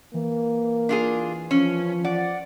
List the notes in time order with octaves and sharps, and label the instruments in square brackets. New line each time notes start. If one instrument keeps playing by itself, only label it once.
[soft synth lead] E3 [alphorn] A#3
[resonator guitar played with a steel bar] D4 F4 G#4
[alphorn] F3 [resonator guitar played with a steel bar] C#4
[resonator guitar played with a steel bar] D5 [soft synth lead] F#5